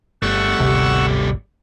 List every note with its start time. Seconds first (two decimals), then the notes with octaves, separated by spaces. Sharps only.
0.22 G1 G3 A3 F#5 C#6 E6
0.60 G#1 D2 C3